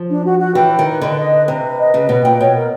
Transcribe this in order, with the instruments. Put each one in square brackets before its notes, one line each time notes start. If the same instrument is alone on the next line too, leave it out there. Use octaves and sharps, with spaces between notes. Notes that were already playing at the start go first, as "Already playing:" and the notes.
Already playing: [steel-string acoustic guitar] F3
[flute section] D4
F#4
F#4
[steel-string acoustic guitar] E3 [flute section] G5
[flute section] B4
[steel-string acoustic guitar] D#3
[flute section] B4
[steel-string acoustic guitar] D3 [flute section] D#5
[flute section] D#5
B4
[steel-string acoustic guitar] C3 [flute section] B4
[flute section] B4
D#5
[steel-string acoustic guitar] C#3 [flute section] B4
[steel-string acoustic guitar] B2 [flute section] B4
[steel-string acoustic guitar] A#2 [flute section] G5
[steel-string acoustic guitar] B2 [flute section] C#5
[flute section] A#4